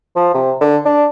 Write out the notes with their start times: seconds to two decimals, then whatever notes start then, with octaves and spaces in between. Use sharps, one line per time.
0.16 F3
0.34 C3
0.61 D3
0.85 D4